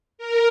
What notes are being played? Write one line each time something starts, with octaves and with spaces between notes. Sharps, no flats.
A#4